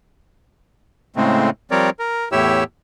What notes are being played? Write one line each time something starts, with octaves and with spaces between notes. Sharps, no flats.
A2 C#3 G#3 A3 C4
F3 G3 C4 A#4 C#5 D5
A#4
E2 A2 E4 G4 C#5 E6